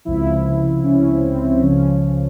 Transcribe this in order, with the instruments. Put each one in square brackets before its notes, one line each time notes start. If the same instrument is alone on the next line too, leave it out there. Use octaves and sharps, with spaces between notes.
[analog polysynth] C#2 C3 F3 E4
C#4
C4
C4
C#2 C#3 F3 C#4